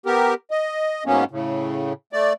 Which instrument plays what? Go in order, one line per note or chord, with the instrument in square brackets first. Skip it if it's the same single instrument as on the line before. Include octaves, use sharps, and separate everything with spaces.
[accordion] B3 G4 A#4
D#5
G#2 F#3 A#3 B3 C#4
A2 C#3
A3 D5